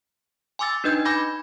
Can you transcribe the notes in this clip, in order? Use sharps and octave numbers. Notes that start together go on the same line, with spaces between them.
G#5 C6 D6 E6 A6
D4 D#4 B4 D#5 G6 G#6
G#5 B5 D6 G6 G#6 A#6